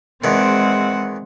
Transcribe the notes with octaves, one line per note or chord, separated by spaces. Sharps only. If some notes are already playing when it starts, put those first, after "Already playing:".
E2 D#3 G#3 C4 F#5